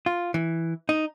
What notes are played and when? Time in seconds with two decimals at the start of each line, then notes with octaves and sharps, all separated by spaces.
0.06 F4
0.34 E3
0.89 D#4